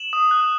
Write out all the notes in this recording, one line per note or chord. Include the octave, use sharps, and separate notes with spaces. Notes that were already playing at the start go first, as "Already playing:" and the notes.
Already playing: E7 F#7
D#6
F#6